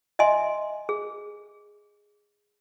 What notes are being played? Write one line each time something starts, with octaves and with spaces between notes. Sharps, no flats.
D#5 E5 G#5 C6
G#4